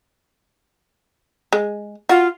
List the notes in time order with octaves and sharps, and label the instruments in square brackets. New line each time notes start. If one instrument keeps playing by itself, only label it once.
[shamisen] G#3
[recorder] F4 [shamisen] F#4